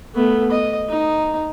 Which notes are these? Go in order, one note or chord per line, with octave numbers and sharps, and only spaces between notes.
A3 B3
D#5
D#4